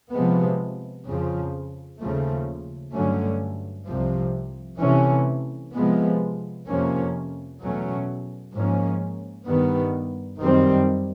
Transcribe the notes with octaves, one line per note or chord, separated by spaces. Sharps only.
C3 F3 G#3 B3
F2 C#3 F3
D#2 C#3 F3 A3
G2 D3 F#3 A3 C#4
C2 C3 F3
C3 E3 A3 C#4
C3 F3 G#3 B3
F2 C3 F3 A#3 C#4
E2 B2 F#3 A3 C#4
G#2 F3 A#3 C#4
G2 D#3 G3 B3
F#2 D#3 G3 C4